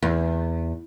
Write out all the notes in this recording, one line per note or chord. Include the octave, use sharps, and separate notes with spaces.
E2